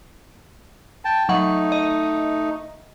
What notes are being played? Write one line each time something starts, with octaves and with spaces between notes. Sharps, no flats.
G5 A5
F#3 A3 D#4 F#5
D#5